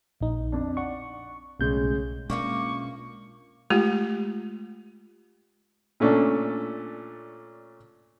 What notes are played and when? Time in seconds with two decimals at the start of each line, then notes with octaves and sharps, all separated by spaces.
0.20 A#1 D#4
0.52 F2 D4
0.77 D5 F#5 C#6
1.60 B1 A2 C#3 G#3 G6
2.30 B2 G#3 A#3 C#4 D4 F4 C#6 D6
3.70 G#3 A3 F4 G4
6.00 A#2 A3 C#4 D4